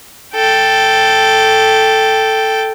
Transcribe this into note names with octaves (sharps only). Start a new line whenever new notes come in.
A4 G5